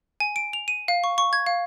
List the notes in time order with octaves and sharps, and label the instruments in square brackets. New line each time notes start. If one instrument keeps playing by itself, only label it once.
[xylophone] G#5
D7
F7
D#7
F5
C#6
C#6
G#6
F5